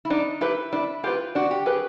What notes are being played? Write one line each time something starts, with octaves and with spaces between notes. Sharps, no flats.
E4
D4 D#4
E4 G4 B4
D4 E4
F4 G4 B4
D4 F#4
G4
G4 G#4 B4